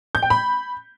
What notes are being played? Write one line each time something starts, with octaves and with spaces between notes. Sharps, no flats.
G6
G5
B5